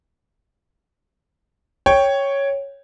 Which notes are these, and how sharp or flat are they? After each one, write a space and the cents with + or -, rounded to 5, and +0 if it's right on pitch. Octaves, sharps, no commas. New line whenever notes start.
C#5 +0 G5 +0